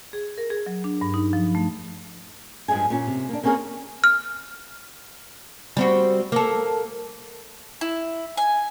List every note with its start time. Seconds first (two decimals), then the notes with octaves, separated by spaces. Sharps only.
0.13 G#4
0.38 A#4
0.50 G#4
0.66 F#3
0.84 D4
1.01 G2
1.14 D#4
1.33 F3
1.55 A3
2.68 G2 F3 G#3 G#4 G#5
2.90 A#2 C#4
3.07 C3
3.29 A#3 D4
3.43 A#3 C4 C#4 F#4 G#4 A#4
4.04 F6
5.77 G3 C4 F#4
6.32 A#3 A4
7.81 E4
8.37 G#5